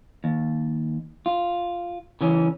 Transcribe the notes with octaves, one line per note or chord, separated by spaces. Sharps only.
D#2
F4
C#3 E3 C#4